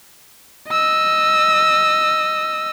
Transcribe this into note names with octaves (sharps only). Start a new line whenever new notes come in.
D#5 E6